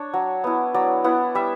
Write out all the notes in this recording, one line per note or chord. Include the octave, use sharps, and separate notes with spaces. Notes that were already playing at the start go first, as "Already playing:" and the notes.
Already playing: D4 C#5
F#3
B3 E4
F#3 D5
B3 E4 F#5
G3 E5